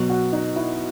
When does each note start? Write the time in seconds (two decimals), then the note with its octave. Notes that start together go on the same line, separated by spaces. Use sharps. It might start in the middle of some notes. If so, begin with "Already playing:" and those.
Already playing: B2 F#3
0.09 F#4
0.33 D#4
0.56 E4